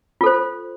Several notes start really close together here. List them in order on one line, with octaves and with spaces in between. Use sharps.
F4 A4 C5